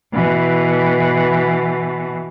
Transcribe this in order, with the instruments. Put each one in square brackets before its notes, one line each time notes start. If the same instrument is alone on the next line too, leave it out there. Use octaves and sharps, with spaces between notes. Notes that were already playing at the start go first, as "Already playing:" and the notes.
[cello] B2 E3